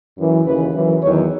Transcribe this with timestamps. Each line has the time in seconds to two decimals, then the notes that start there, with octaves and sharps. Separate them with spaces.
0.17 F#2 E3
0.45 D#2 C#3 E3 B4
0.73 F#2 E3
1.02 E2 D#3 F#3 C#5